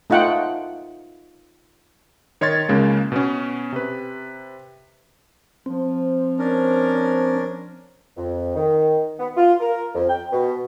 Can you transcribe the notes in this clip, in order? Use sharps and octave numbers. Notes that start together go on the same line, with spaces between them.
A3 D#4 F4 F#5 G5
D#3 C#5 D#5 C6 G#6 A6
C#2 C#3 G#3 A#3
B2 B3 C#4
C3 B4
F3 C4
C#4 D4 A#4
F2
D#3
B3
F4
A#4
F2
G5
B2